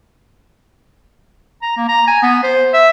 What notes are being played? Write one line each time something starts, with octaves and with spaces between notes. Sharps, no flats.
A#5
A#3
A#5
G#5
B3
C5
E5